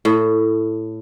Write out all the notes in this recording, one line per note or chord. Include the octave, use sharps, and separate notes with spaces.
A2